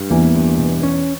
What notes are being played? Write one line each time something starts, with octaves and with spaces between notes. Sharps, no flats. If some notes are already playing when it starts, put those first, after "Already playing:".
Already playing: G2
E2 E3 A#3
G2
B2
C#4